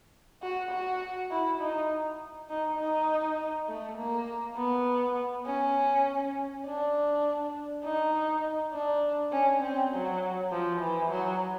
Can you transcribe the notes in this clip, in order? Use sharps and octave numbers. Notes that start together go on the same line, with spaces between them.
F#4
F#4
E4
D#4
D#4
D#4
A3
A#3
B3
C#4
D4
D#4
D4
C#4
C4
F#3
F3
E3
F#3